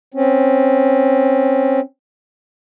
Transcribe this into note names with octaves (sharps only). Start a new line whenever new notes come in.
C4 C#4